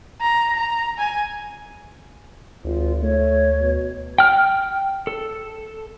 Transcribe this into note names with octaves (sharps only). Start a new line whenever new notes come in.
A#5
A#5
G#5
G#1 D2 F4
A3 C#5
B2
G5 F6
A4